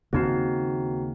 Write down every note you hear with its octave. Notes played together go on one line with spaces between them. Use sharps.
D#2 C#3 A#3 C4 D#4 F#4